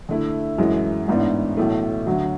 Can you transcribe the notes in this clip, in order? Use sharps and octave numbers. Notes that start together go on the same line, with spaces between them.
D3 A3 E4
F#2 E3 G#3
A1 G#2 E3 B3 D4
B1 A2 E3 A3
D2 D3 F#3